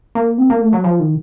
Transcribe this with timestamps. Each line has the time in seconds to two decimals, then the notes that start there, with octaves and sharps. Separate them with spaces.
0.15 A#3
0.38 C4
0.50 A#3
0.61 A3
0.73 F#3
0.84 F3
0.99 D#3